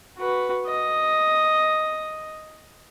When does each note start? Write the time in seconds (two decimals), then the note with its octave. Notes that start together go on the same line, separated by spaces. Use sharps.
0.18 F#4 B4
0.66 D#5